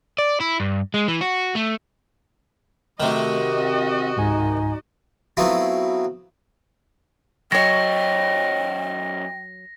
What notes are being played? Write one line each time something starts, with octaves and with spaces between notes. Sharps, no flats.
D5
E4
G2
G#3
E3
F#4
A3
C3 D#3 A3 F#4 D#5
C4
C#2 G#2 D#4 G#5
F#3 A3 B3 C4 E4 F4
F#2 F#3 C#5 D#5 G5 A#6